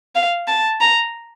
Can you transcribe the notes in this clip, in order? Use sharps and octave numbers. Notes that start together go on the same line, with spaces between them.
F5
A5
A#5